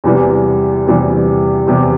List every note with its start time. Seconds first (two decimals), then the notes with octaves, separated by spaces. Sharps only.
0.04 E2 C3 E3 G3
0.86 E2 C3 E3 G3
1.67 E2 C3 E3 G3